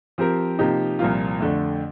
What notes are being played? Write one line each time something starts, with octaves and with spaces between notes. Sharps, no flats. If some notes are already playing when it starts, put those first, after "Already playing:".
F3 C4 G4 A#4
C3 F3 A#3 D#4 G4
C2 A#2 F3 A#3 F4
F2 D3 A3